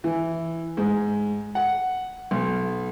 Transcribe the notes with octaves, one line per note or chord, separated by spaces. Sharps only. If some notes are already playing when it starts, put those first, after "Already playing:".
E3
G#2
F#5
B1